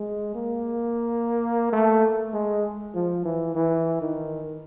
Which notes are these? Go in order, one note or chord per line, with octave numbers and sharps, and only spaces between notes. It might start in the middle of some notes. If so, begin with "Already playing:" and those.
Already playing: G#3
A#3
A3
G#3
F3
E3
E3
D#3